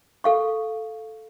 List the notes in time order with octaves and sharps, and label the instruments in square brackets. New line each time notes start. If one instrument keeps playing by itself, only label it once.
[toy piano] A4 F5 C#6